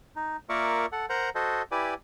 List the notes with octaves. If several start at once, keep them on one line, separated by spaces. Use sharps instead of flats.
D#4
A#3 F4 A#4 D5 E5 C#6
A4 F#5
A#4 C5 F#5 A#5
F#4 A4 C5 D#5
E4 G4 B4 D5 G#5